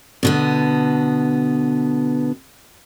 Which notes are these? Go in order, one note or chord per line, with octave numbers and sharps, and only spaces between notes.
B2 D3 B3